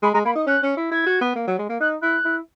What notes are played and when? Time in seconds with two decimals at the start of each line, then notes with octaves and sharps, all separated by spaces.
0.03 G#3 B5
0.13 G#3 A#5
0.25 A#3 B5
0.36 D#4 D#6
0.47 C#4 F#6
0.63 C#4
0.77 E4
0.91 E4 G#6
1.06 F#4
1.21 B3
1.36 A#3
1.47 F#3
1.59 G#3
1.69 A#3
1.80 D#4 F#6
2.02 E4 F#6
2.25 E4